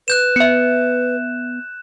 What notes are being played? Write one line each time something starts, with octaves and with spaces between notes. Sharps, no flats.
B4 F#6 G6 E7
B3 E5 C#7